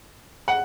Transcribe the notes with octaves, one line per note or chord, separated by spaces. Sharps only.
F#5